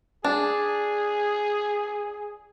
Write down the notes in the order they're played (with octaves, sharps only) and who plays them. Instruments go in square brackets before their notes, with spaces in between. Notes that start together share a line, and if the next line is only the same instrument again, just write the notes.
[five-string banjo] D4 [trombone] G#4